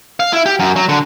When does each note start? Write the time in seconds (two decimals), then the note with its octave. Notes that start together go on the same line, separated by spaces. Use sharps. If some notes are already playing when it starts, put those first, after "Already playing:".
0.20 F5
0.33 E4
0.46 G4
0.59 F#2
0.76 F#3
0.89 D3